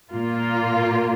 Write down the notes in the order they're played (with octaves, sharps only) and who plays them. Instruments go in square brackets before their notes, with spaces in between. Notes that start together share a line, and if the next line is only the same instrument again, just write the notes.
[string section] A#2 A#3 F4